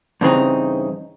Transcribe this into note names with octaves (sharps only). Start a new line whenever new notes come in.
G2 C#3 E3 C4 D#4